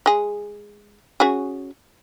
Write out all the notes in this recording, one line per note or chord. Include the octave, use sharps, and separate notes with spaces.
G#3 G#4
C#4 F#4 G#4